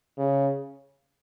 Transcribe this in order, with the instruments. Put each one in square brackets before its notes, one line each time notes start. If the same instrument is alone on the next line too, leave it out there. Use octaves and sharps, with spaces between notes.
[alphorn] C#3